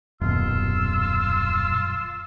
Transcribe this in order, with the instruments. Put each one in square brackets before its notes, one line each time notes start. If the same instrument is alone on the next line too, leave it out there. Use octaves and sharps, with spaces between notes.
[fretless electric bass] D#1 [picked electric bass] F#2 B2 [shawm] F4 [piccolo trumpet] E6